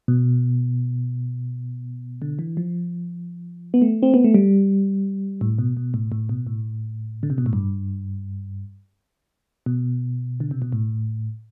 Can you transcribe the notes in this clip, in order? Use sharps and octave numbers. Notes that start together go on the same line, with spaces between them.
B2
D3
E3
F3
B3
A3
C4
B3
A3
G3
A2
B2
B2
A2
A2
B2
A2
D3
C3
B2
A2
G2
B2
D3
C3
B2
A2